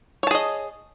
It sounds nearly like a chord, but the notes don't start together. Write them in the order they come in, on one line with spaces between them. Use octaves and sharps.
C#5 A5 G#4 D#5